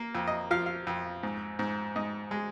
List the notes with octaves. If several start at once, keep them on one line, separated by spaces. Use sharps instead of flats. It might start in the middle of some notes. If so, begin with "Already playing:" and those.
Already playing: A#3
F2
D#5
F3 F5
F5
F2
G#2
G#2
G#2 D#5
G#3